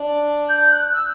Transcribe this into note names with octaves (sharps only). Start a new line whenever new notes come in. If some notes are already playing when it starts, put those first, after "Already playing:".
Already playing: D4
G6
G6
F#6
E6